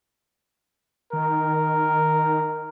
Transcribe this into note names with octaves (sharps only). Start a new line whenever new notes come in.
D#3 A#4